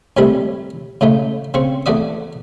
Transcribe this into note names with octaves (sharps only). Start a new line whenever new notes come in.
A2 C3 D#3 G3 A3 E4
A2 C#3 A3 D#4
C#3 C4 C#6
E2 A3 F#4 D5 D#6